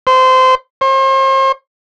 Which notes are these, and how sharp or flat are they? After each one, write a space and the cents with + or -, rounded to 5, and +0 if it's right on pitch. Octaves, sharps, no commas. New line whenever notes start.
C5 -20
C5 +40